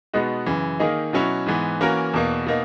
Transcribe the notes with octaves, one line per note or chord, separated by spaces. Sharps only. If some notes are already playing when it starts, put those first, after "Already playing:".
B2 G#3 B3 D#4 F#4
F#2 C#3 E3
D#3 A#3 D#4 G#4
B2 F#3 C#4 E4
G#2 E3 B3
E3 A#3 C#4 F#4 A#4
E2 B2 A#3
B2 A#3 D#4